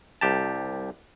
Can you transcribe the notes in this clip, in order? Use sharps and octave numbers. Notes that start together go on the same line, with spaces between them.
C2 G4 A5